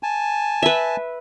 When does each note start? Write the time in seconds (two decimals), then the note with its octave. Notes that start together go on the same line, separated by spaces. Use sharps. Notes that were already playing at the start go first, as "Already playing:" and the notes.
0.03 G#5 A5
0.63 B4 E5